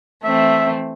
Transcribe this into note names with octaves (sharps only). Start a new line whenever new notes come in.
E3 A3 C4 E5